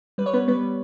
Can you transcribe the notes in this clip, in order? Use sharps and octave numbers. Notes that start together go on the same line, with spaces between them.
G3 B4
C#5
B3 B4
G3 B3 B4